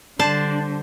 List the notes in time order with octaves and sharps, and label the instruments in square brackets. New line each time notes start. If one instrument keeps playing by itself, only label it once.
[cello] D3 G3 [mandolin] D4 [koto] C5 A5